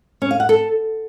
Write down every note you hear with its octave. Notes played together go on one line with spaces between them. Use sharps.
C#4
F5
F#5
A4